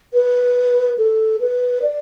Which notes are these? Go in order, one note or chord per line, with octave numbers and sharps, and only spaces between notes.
B4
A4
B4
D5